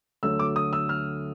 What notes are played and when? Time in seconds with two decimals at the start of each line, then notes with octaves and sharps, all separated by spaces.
0.23 D2 D3 F#3 A3 E6
0.39 D6
0.56 D#6
0.73 E6
0.89 F6